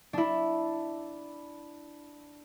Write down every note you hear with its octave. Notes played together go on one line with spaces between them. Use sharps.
D4 E4